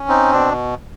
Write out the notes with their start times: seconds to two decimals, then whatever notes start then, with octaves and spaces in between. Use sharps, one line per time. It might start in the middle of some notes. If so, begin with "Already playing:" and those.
Already playing: C#4
0.08 C4 D#4
0.32 B2 D4